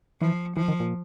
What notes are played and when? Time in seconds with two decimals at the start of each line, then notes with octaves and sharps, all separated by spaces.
0.21 E3 F3
0.56 E3 F3
0.68 D#3
0.80 A#2